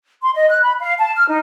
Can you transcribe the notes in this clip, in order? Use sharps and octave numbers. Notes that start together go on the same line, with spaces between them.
C6
D#5
F#6
B5
F5
A5
F6
D#4